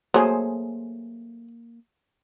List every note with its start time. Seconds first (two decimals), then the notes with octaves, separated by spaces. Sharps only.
0.14 F#3 A3 A#3 G#4 C5